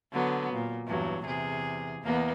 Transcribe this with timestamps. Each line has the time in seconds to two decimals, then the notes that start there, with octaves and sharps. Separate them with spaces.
0.12 D3 F#3 B3
0.53 A#2
0.86 E2 G2 F#3
1.24 E2 C3 G#4
2.02 E2 A#3 B3